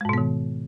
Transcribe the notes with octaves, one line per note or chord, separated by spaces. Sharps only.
G#2 B2 D#3 G#3 B3